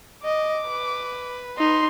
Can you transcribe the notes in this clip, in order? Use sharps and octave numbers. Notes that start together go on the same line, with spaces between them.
D#5 D6
B4
D#4 C6